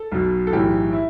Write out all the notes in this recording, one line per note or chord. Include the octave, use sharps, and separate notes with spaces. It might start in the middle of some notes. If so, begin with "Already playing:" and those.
Already playing: A4
B1 B2
A4
B1 A2 E3 G4
E4